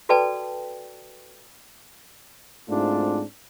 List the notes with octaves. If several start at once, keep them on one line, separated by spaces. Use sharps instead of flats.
F#4 A4 B4 D5 G5 A5
G#2 A3 C4 D4 E4 F4